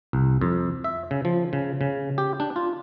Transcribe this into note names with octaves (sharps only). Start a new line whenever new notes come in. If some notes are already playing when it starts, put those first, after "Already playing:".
C2
F2
E5
C#3
F3
C#3
C#3
G4
D4
F4